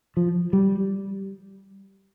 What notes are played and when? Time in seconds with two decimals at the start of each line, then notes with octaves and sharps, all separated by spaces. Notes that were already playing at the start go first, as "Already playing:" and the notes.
0.17 F3
0.53 G3